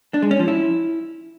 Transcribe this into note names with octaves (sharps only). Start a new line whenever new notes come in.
D4
G#3
C#4
F3
E4